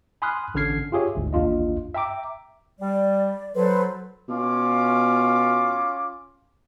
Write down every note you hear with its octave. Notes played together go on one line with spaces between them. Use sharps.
G#5 B5 C6 D#6 F6 F#6
A1 D3 C#4 F6 G#6 C7
F4 G4 G#4 C#5 E5
G1 D2 G#2
A1 D#2 D4 F4 D#5
E5 G5 A#5 D6
G3 D5
F#3 A4 B4 C5
B2 C#4 F4 D6